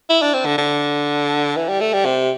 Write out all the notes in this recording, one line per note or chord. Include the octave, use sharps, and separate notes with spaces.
E4
D4
C4
D3
D3
E3
G3
A3
G3
C3